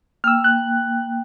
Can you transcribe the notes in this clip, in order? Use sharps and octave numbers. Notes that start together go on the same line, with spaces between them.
A#3 G5 E6 F6
F#6